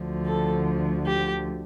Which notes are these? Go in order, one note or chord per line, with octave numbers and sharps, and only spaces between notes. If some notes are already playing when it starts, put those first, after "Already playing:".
Already playing: D2 D3 F3
A4
G4